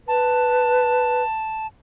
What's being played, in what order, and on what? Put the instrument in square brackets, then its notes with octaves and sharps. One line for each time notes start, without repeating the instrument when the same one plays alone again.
[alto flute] B4 [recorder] A5